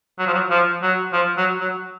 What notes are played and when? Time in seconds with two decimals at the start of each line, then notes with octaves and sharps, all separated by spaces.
0.19 F#3
0.27 F3
0.34 F#3
0.50 F3
0.82 F#3
1.13 F3
1.37 F#3
1.60 F#3